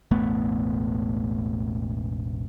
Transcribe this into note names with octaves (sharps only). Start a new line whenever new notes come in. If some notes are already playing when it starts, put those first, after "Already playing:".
E1 A1 A3 B3